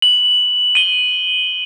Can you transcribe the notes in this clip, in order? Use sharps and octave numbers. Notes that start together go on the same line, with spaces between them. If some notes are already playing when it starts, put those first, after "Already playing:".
F#7
D#7 G7